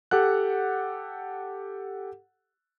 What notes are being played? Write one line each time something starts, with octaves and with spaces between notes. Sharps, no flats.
G4 A4 F#5 F#6